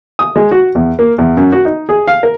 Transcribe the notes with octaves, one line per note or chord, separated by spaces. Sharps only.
D#6
G#3
F#4
E2
A#3
E2
F#2
F#4
D#4
G#4
F5
A#4